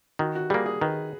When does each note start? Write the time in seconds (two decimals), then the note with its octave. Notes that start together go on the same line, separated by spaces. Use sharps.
0.19 D#3 F#4
0.35 F#4
0.50 G3 A#3 G#4
0.66 G#4
0.81 D#3 B4